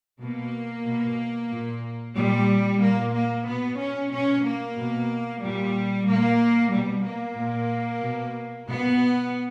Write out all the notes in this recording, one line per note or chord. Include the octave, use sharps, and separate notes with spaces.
B2 A#3
B2
A#2
A#2 G3
A#2 A#3
A#3
B2 B3
C#4
B2 C#4
A#3
B2
A#2 G3
A#2 A#3
B2 G3
A#3
A#2
B2
B2 B3